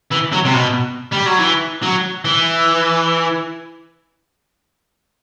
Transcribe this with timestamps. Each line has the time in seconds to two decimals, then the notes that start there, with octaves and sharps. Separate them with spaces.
0.11 E3
0.32 F#3
0.45 C3
0.54 B2
1.12 G3
1.26 F#3
1.39 E3
1.83 F#3
2.25 E3